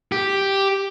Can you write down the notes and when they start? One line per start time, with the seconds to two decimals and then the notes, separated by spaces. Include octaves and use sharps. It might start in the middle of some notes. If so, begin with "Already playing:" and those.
0.12 G4